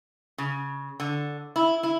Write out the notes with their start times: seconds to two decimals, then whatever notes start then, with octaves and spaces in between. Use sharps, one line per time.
0.38 C#3
1.00 D3
1.56 E4
1.83 E4